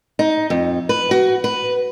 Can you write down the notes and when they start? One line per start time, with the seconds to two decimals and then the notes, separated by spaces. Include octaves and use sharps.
0.19 D#4
0.50 F2
0.89 B4
1.11 F#4
1.44 B4